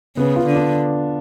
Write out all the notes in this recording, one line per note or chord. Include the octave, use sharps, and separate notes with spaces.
C#3 B3
F4
D3
D4